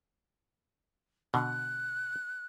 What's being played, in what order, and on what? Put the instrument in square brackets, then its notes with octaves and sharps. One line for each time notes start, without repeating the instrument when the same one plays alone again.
[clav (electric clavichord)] B2 D3 [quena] F#6